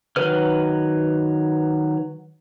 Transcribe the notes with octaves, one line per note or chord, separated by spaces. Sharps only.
D#3 F#3 B4 F6